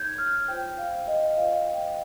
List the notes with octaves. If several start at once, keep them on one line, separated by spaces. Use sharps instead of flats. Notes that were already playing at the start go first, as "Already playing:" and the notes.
Already playing: D#4 G4 A#4 C#5 G6 G#6
F6
F4 C5 G5
F5
D#5
F4 C5 F5
G5